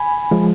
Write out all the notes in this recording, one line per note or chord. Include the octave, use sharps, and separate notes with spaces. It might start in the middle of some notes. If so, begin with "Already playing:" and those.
Already playing: G#5 B5
F3 G#3